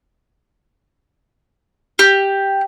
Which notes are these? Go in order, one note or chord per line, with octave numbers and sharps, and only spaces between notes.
G4